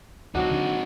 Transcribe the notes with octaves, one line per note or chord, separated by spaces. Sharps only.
D2 F#3 C4 D4 D#4 F#4
D3